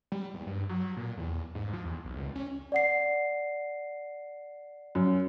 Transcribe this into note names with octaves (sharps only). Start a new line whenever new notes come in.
G3
E2
G2
F#3
A#2
E2
G#2
F3
E2
B1
C#2
C#4
D5 F#5 C7
F#2